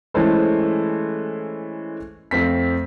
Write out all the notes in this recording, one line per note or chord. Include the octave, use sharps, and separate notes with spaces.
E3 G#3 A3 C#4 A4 C5
F2 A3 C4 B6